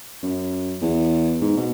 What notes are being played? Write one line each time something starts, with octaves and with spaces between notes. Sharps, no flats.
F#2
E2
G#2
B2